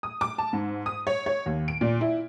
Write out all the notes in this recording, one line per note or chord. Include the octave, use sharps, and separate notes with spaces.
D#6
D6
A5
G#2
D#6
C#5
C#5
D#2
D7
A#2
E4